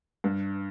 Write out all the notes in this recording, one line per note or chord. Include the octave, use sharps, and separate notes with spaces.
G2